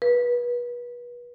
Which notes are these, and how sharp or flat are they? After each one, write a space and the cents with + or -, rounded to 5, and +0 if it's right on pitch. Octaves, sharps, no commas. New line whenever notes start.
B4 -30